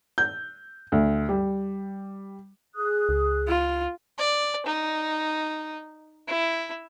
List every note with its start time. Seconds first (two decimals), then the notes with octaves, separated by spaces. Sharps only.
0.18 G6
0.92 D2
1.29 G3
2.75 G#4 D#6 F#6
3.09 C#2
3.49 F4
4.18 D5
4.66 D#4
6.28 E4